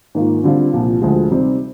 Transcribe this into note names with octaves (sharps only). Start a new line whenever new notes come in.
G#2 D#3 A#3 F4
D3 G3 C4 F4
C2 A#2 F3
D2 D3 F3 G#3
C3 G3 C4 D#4